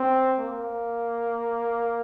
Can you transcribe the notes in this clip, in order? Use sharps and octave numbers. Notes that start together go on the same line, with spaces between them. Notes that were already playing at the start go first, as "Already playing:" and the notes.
Already playing: C4
A#3